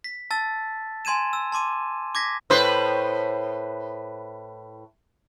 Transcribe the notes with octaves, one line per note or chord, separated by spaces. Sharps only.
B6
A5 E6 A6
G#5 C6 G#6 D#7 E7
E6
A5 C6 D6 D#7
D6 G#6 A#6 B6
A2 B4 C5